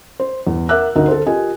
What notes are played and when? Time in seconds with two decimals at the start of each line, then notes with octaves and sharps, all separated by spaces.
0.20 C5
0.47 E2
0.69 A#4 E5 F#5 D6 E6 F#6
0.96 D2 D#4 A#4 D#5 F#5
1.08 A4 C5
1.26 F4 G4 A#4 D#5 G#5